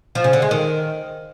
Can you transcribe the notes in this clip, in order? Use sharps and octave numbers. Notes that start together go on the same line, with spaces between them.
F3
C#3
D3
G#3
D#3